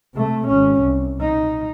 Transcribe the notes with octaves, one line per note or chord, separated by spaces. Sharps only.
C3 A3
G#1 C#4
C2
D#4